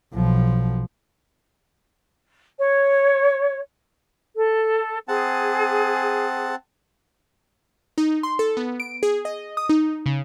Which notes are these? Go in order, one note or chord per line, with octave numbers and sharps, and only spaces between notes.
B1 F3
C#5
A4
C4 G#4 F#5 A5
D#4
C6
A4
B3
D7
G#4
D#5
D#6
D#4
C#3